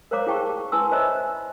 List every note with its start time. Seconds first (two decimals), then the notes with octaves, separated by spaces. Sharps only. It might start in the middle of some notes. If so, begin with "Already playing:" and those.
0.11 A#4 C5 C#5 F5 A#5 D6
0.27 E4 G#4 G5 A5 C#6
0.72 E4 B4 G#5 A5 C6 E6
0.92 C5 C#5 D#5 E5 A#5 B5